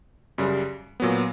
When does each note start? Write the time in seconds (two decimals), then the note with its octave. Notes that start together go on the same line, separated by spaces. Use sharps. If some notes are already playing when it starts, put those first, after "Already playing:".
0.38 F#2 C#3 G3
1.00 A#2 F#3 B3